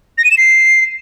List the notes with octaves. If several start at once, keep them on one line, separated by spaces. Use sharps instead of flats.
A#6
D#7
E7
C7